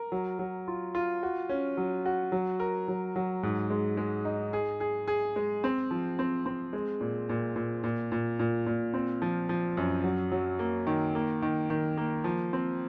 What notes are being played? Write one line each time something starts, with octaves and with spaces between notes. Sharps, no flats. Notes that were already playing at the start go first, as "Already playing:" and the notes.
Already playing: A#4
F#3
F#3
F4
F4
F#4
C#4
F#3
F#4
F#3
A#4
F#3
F#3
G#2
G#3
G#3
D#4
G#4
G#4
G#4
G#3
C4
F3
C4
C4
G#3
A#2
A#2
A#2
A#2
A#2
A#2
A#2
C4
F3
F3
F#2
F#3
F#3
A#3
D#3
A#3
D#3
D#3
A#3
F3
C4